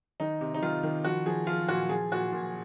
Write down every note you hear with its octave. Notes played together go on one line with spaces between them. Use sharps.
D#3 D#4
C3
D#4
D#3 F4
D#3
F3 F#4
F3 G#4
F3 F4
A#2 F#4
F3 G#4
A#2 F#4
A#2